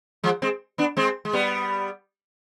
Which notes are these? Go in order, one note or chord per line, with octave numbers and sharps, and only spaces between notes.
F3 G#3
G#3 C4
B3 D4
G#3 C4
G#3
G3 B3